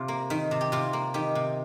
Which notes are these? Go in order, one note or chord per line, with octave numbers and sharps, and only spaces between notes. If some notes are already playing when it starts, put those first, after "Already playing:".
Already playing: C3 F4
A#3
D#3
C3
G4
C3 F4
A#3
D#3 G4
C3